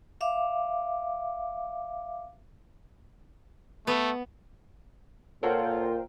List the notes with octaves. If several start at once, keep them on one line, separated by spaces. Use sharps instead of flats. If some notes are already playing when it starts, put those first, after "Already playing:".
E5 F5 D6
A3 B3
A#2 F4 A4 A#4 C5 C#5 F#5 G5